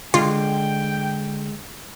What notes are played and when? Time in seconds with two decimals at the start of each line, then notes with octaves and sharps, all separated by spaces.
0.14 D3 G#3 F4 G5